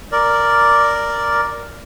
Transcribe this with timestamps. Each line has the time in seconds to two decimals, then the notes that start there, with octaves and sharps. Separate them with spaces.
0.12 A#4 D5